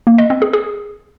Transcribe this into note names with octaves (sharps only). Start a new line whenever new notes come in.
A#3
D#5
C4
G#4
G#4